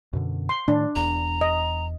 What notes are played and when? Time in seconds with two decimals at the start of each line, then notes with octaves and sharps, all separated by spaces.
0.13 F#2 B2 D3
0.49 C6
0.68 A2 D#3 D4
0.96 E1 E2 A#5
1.41 D#5